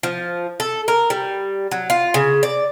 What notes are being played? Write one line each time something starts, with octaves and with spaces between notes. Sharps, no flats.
F3
A4
A#4
G3
F#3
F4
C#3
D5